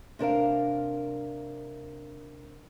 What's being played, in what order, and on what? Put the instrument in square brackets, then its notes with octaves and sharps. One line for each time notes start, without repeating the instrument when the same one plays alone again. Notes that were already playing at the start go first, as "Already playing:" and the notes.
[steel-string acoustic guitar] C3 D4 A#4 F5